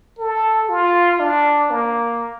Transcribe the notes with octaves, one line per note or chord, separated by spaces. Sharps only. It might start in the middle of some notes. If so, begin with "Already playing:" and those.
A4
F4
D4
A#3